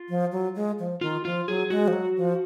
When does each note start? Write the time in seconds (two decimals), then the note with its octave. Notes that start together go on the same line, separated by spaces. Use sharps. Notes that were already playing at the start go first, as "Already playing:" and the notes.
Already playing: F4
0.09 F3
0.32 F#3
0.56 G#3
0.79 F3
1.01 D#3 F4
1.25 F3 F4
1.48 F#3 G#4
1.70 G#3 F#4
1.88 F3
1.93 F#3
2.17 F3